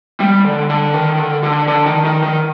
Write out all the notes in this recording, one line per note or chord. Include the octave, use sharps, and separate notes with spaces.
G3
D3
D3
D#3
D3
D3
D3
D#3
D#3
D#3